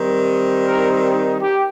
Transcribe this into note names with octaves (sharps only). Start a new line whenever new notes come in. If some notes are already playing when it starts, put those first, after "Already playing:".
Already playing: D#3 G3 C4 D#4
A#4
G4